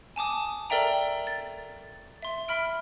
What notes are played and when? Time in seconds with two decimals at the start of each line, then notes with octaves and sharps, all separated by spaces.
0.16 G#5 A5 D6 D#6
0.70 A4 A#4 D5 E5 G5 A#5
1.27 A6
2.23 E5 C6
2.48 E5 B5 F6 D7